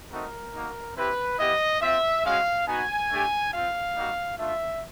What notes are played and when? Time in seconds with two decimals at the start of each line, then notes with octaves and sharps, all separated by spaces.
0.11 A3 C4 D#4 F#4 A#4
0.54 A#3 D#4 F#4
0.96 C4 E4 G4 B4
1.39 B3 E4 G4 D#5
1.81 C4 F4 E5
2.24 G#3 C#4 F#4 F5
2.67 B3 D#4 F#4 G#5
3.10 A3 D4 G4
3.52 C4 F4 F5
3.95 G3 A#3 D#4 F#4
4.38 A3 D4 F4 E5